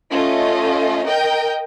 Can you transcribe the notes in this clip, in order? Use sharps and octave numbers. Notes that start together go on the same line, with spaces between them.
A3 C#4 F4 D#5
A#4 D#5 G5 G6